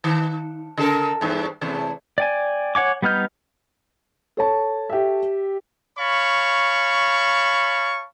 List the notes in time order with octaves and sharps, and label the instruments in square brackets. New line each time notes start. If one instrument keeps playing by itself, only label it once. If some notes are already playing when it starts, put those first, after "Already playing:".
[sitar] D#3
C#3 A4 A#4
E2 G2
E2 C3 A3
[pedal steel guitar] D5 G5 G#5
C#5 F#5 G#5 D6
G3 B3 D#4 F6 G6
[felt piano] A4 C#5 A5
[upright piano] G4 E5
[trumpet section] C#5 F5 A5 B5 C#6